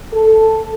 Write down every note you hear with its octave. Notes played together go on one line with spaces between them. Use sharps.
A4